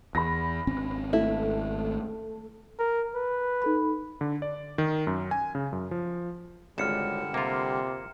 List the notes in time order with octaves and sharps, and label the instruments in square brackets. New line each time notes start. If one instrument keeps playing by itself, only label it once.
[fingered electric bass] E2 [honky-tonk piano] B5 A#6
[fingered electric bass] G#1 C4 C#4
[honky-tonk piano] A3 [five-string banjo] E4
[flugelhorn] A#4
B4
[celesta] D#4 A4 B5
[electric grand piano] D3
D5
D#3
F#2
G#5
C#3
F#2
F3
[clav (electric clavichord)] G#1 C#2 [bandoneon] D3 G3 [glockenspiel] F6 C#7 E7
[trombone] C3 [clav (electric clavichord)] A#3 F4